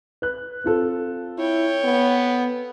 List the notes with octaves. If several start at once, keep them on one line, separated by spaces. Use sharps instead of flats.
B4 F#6
C4 F4 A4
E4 C#5 G5
B3